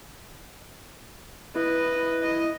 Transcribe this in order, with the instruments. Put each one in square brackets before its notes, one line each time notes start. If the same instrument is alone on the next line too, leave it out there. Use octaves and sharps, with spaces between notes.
[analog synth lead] E4 [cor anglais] B4 [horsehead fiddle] D#5
[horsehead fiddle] D#5